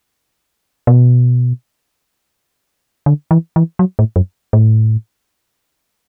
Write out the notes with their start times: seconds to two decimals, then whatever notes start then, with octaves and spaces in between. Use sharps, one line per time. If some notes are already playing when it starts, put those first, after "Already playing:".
0.87 B2
3.06 D3
3.31 E3
3.56 E3
3.79 F#3
3.99 A2
4.16 F#2
4.53 A2